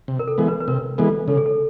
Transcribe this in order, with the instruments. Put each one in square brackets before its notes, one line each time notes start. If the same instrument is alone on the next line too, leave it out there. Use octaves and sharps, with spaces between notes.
[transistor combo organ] C3
[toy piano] A#4
A4
[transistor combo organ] E3 G#3 B3
[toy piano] B4
B4
[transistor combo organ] C3 [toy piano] A#4
[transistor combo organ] E3 G#3 B3 [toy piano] A4
[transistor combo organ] C#3 [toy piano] A4
[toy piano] G#4
A4